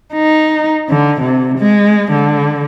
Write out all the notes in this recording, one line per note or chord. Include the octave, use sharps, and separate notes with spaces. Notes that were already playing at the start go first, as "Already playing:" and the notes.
D#4
D3
C3
G#3
D3